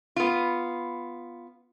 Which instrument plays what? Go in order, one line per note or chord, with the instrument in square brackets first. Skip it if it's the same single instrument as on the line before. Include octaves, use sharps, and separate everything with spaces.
[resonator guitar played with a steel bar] B3 F4